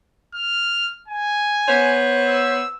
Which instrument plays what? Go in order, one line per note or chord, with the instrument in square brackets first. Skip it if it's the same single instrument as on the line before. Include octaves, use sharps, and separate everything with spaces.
[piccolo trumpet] F6
G#5
[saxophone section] B3 C5 C#5
[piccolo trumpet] E6